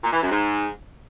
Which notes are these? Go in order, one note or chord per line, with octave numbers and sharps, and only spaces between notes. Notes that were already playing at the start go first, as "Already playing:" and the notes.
A#2
E3
F#2
G#2